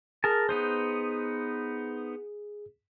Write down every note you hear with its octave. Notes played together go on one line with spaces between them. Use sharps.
G#4 A#4 A5
B3 D#4 C5